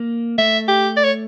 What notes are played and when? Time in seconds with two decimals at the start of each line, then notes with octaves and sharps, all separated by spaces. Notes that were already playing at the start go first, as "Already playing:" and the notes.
Already playing: A#3
0.38 A3 E5
0.68 G4
0.97 D5
1.04 C#5